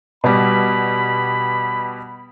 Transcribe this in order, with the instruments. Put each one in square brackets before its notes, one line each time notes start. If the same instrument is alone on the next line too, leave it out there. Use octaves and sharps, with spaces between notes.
[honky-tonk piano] B2 G3 [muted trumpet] B5